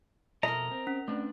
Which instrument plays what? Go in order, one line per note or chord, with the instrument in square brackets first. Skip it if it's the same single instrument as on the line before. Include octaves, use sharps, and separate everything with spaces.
[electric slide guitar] F2 B2 A4 [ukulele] A#4 D#5 [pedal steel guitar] A#5
[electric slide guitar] C4
[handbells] C#4
[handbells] A3 [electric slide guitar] C4 D4 B4